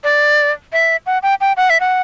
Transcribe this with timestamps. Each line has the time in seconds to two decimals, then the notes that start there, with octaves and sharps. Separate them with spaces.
0.04 D5
0.72 E5
1.06 F#5
1.23 G5
1.41 G5
1.57 F#5
1.70 E5
1.80 F#5